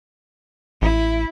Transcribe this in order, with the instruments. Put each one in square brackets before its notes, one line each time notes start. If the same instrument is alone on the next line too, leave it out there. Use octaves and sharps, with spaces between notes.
[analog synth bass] A1 [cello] E4